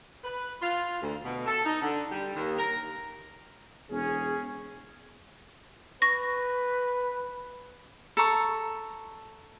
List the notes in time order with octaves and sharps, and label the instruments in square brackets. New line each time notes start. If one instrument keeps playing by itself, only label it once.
[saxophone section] B4
F4
D2
B2
A4
D#4
D3
G3
D#2
A#4
[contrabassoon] E1 [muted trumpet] C#4 [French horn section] G#4
[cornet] B4 [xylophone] C#6 A#6
[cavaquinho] A4 A#5 C#6